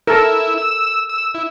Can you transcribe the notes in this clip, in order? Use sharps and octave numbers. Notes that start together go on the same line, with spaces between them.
E4 A4 A#4
E6
E6
E4